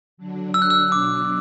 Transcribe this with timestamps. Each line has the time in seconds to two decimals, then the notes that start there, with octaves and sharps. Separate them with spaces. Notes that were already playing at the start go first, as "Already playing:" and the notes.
0.17 D3 F#3 D4
0.54 E6
0.62 F#6
0.70 E6
0.92 B2 F#3 D4 D6